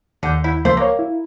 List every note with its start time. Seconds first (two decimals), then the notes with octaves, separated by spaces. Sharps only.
0.23 D#2 D3 F#5 G6
0.44 E4
0.65 C#2 F3 A3 A#3 C5
0.77 A#3 A#4 C#5
0.99 E4